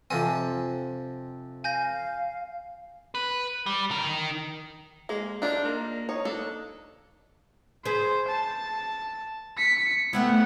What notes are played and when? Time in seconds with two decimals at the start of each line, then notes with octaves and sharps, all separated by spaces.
0.10 F2 C3 C4 G#5
1.64 F5 G#5 G6 A#6
3.15 B4
3.66 G3
3.91 D#3 A#4
5.09 G#3 A#3
5.42 D4 D#4 F4
5.65 A#3
6.09 D#4 C#5
6.25 A#3 D4 A4
7.85 G#4 B4 C5
8.28 A5
9.57 B6 C#7
10.13 A3 B3 C4 E4 F#5